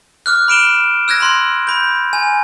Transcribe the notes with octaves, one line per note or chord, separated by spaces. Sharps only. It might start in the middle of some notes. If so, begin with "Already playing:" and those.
D6 F6 F#6
B5 D7 E7 G7
E6 F#6 G#6 A#6
B5 C6 A#6
B5 G6
G#5